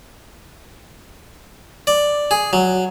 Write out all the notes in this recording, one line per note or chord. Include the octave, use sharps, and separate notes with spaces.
D5
G#4
F#3